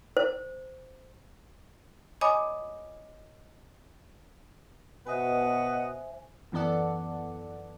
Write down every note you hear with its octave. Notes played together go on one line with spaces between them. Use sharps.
C5
C#5 D#5 G#5 B5 D6 D#6
B2 B4 C5 D#5 E5 F#5 G#5
F#2 E3 B3 A4 D5 F#5